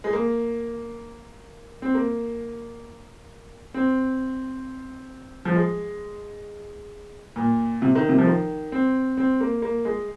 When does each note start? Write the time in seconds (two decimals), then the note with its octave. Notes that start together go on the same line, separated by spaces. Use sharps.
0.04 G#3
0.13 A#3
1.82 C4
1.94 A#3
3.74 C4
5.45 F3
5.55 G#3
7.36 A#2
7.82 C3
7.95 D#3
8.09 C3
8.18 F3
8.26 D#3
8.72 C4
9.17 C4
9.41 A#3
9.62 A#3
9.85 G#3